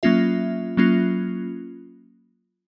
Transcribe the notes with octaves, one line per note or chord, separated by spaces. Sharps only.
F#3 A#3 C#4 F4 E5
F#3 A#3 C#4 F4